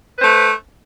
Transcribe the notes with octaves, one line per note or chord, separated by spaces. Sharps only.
A3 B4 C5